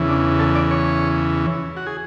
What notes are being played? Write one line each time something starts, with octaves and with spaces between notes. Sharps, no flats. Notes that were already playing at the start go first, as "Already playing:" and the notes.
Already playing: E2 C#3 E3
D4
A4
D5
C#5
F#4
G#4